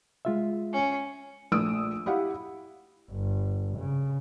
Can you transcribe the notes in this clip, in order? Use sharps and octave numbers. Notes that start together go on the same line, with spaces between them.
G#3 F4 E5
C#4
A#1 A3 D#6 E6 D7
E4 G4 F5 F#5
G1
C#3